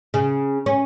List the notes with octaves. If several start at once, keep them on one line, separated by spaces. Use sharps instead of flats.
C#3
C#4